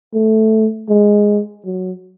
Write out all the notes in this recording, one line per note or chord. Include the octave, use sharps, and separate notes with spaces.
A3
G#3
F#3